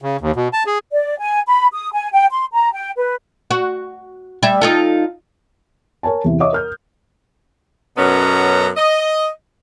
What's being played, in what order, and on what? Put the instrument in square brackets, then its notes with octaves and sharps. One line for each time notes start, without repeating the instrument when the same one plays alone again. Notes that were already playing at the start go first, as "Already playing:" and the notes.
[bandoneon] C#3
D#2
B2
A5
G#4
[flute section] D5
G#5
B5
D#6
G#5
G5
C6
A#5
G5
B4
[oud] F#4
G3 E5
D#4 F4 A4
[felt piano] A#4 C#5 G#5 A5
E2 C3 E3
C#5 D#5 E5 D6 D#6
A#4 F6 G6
[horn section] F#2 B2 B3 C#4 A4 A#5
D#5